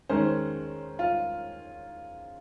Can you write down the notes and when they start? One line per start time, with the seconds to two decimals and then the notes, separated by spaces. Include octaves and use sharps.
0.09 D#3 G#3 C#4 C5
0.99 F4